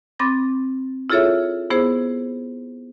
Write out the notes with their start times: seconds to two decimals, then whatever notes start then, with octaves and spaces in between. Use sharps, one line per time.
0.19 C4 B5 D6 A6 A#6
1.10 E4 F4 G#4 A4 C#5 E5
1.70 B3 E4 G#4 C5